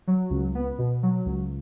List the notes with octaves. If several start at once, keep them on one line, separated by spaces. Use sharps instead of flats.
F#3
C#2
B3
B2
F#3
C#2